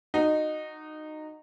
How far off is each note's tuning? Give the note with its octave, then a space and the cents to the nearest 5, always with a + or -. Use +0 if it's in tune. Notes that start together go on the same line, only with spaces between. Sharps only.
D#4 -15 F#4 +0